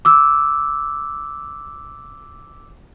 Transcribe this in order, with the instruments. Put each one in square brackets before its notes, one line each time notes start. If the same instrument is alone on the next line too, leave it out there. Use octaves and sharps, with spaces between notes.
[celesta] D6 E6